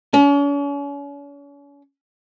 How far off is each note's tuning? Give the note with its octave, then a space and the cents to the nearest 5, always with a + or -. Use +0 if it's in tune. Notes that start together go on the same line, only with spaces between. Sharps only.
C#4 +40